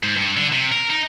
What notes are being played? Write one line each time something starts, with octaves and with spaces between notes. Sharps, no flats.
G#2
G2
D3
C3
A#4
D#4